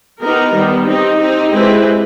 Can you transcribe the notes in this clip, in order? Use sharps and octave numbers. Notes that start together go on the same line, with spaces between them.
B3 D#4 G4 A#4
D#3 G3 B3
C4 D#4 G4
C4 D#4 G4
G#3 C4 E4 G4 B4